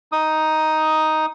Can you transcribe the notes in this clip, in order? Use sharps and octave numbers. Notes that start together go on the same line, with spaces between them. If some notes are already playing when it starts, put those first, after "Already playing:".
D#4 D#6